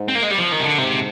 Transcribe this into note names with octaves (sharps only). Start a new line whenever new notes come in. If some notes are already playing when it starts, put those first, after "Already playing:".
Already playing: G#2
C4
A#3
G#3
G3
F3
D#3
C3
D3
G#2 C3